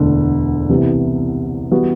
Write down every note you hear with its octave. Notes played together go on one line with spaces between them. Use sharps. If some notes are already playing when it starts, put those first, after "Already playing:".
Already playing: E1 D2 D3
C2 C3 E3 B3
E3 G3 B3 F#4